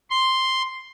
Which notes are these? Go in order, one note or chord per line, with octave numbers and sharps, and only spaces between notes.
C6